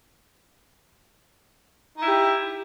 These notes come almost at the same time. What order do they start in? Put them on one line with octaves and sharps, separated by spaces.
D#4 E4 G4